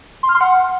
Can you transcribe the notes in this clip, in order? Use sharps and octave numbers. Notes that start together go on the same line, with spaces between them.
C6
F6
C6
F#5